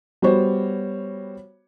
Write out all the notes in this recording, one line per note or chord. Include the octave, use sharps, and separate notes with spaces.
G3 B3 F#4 C5 C#5